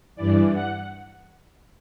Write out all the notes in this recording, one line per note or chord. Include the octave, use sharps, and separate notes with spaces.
G2 E3 D5
F#5